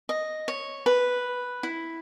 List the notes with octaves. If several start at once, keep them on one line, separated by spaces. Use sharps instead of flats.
D#5
C#5
B4
E4